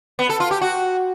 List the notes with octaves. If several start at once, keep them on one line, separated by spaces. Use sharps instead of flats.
B3
A4
F4
G4
F#4